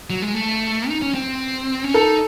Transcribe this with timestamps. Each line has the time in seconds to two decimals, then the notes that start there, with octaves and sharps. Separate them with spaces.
0.10 F#3
0.22 G#3
0.34 A3
0.89 D#4
1.02 C#4
1.15 C4
1.84 C#4
1.94 D#4 A4